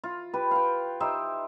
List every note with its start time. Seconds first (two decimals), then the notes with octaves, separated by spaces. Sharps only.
0.04 F4
0.34 G4 B4
0.51 F5 G5
1.00 D#4 G4 C5 E5